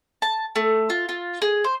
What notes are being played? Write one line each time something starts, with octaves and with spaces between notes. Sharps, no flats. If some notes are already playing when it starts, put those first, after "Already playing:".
A5
A3
F4
F4
G#4
C5